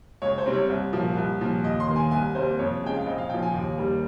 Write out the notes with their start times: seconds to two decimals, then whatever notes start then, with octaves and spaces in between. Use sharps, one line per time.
0.22 C#2 C#5
0.38 C5
0.46 C3 G3 C4
0.53 C#5
0.69 C2
0.93 A#2 F3 A#3
1.17 C2
1.41 A#2 F3
1.64 D#2 D#5
1.80 C6
1.87 D#3 A#3
1.96 G#5
2.11 C2 G#5
2.35 C3 G3 A#3 C5
2.59 F2 C#5
2.83 C#3 G#3 G5
2.96 F5
3.06 A#1 D#5
3.18 F5
3.29 A#2 F3 G5
3.42 G#5
3.54 D#2
3.78 D#3 G3 A#3